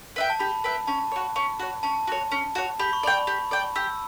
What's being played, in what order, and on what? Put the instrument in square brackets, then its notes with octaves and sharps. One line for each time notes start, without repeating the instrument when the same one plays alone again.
[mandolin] B4 E5 G5
[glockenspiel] A5
[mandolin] G4 [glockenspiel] B5
[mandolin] B4 E5 G5
[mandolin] C#4 [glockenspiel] A5
[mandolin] F#4 C#5
C#4
F#4 C#5
[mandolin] C#4 [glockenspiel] A5
[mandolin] F#4 C#5
C#4
F#4 C#5
[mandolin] G4 [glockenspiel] B5
[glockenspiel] C#6
[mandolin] D5 G5 [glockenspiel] B5
[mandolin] G4
D5 G5
[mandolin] G4 [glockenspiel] E6